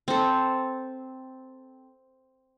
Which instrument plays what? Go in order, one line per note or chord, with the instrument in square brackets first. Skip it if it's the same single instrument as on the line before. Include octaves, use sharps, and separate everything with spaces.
[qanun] C4 A4